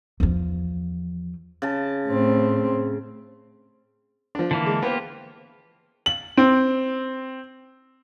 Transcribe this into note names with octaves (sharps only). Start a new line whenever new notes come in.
E2 F3
C#3 A5
A2 C4
F3 D4
D3 E3 A#3
G#3
A#3 B3 F4 G4 C5
F#7
C4